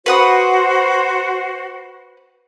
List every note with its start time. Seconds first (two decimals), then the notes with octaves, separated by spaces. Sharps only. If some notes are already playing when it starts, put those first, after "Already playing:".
0.06 F#4 B4 C5 F#5 D#6